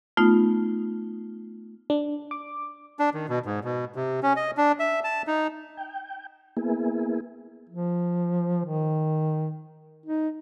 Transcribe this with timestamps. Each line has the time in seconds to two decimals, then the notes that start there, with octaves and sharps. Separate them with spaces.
0.17 A3 B3 D#4 F4
1.90 D4
2.31 D6
2.99 D4
3.14 D#3
3.29 B2
3.45 G#2
3.64 B2
3.95 C3
4.23 C#4
4.36 D#5
4.57 D4
4.79 E5
5.04 A5
5.27 D#4
5.77 G5
6.57 A#3 B3 E4 G#4
7.69 F3
8.65 D#3
10.06 D#4